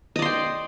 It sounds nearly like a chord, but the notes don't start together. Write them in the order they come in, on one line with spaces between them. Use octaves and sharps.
D#5 D5 C6 G5